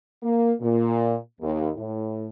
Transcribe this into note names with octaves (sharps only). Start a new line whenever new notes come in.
A#3
A#2
D#2
A2